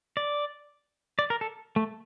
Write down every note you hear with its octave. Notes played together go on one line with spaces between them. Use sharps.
D5
D5
A#4
A4
A3